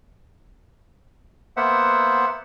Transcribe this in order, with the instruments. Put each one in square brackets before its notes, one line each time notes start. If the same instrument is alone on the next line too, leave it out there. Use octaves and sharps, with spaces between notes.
[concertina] A#3 B3 C5 E5 F#5